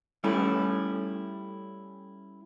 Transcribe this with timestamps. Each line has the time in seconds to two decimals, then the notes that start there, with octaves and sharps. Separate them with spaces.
0.24 G3 A3 C#4 E4